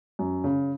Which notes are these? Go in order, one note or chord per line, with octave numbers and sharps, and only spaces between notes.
F#2
C#3